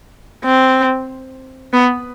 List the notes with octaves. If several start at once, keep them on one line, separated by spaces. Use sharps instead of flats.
C4
B3